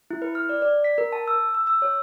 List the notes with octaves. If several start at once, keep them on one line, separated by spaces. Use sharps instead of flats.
E4
B4
F6
D5
D5
B6
A#4
A5
E6
E6
E6
C#5